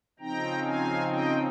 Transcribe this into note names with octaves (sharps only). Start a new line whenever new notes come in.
C#3 F3 C4 D#4 G5 A#5
F5 G#5
D#5 G5